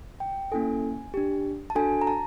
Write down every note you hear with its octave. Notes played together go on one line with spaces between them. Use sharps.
G5
A#3 C#4 E4 A4 G#5
D4 G4
A5
D4 F#4 A4 G#5
A#5
A5